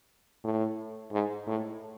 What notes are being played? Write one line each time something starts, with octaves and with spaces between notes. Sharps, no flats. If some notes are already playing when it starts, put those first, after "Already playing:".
A2
G#2
A2